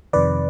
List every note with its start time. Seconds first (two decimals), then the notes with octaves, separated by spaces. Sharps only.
0.13 F2 C3 D#3 B4 D5